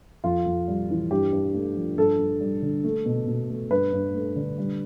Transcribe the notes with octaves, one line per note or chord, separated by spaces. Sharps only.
F2 F4
F2
G3
E3
G2 G4
G2
A3
F3
G2 A4
G2
G3
D3
A3
B2
B2
A3
G2 B4
G2
A3
D3
G3